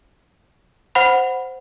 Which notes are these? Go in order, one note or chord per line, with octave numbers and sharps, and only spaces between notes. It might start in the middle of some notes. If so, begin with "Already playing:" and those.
C5 F#5 B5